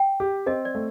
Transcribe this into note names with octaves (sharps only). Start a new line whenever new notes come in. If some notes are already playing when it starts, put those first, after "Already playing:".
Already playing: G5
G4
C4 D#5
D5
A3